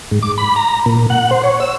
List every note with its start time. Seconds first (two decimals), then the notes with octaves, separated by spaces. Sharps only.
0.11 G#2
0.22 D6
0.38 B5
0.56 A#5
0.86 A#2
1.10 F#5
1.31 C5
1.44 C#5
1.60 E6